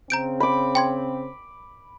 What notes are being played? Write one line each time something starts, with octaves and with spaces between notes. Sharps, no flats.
C#3 C4 A#5 G6 D7
B5 D6
G5 C6 G#6